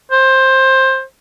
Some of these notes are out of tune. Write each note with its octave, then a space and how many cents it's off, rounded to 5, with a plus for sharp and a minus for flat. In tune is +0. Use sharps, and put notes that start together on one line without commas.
C5 +15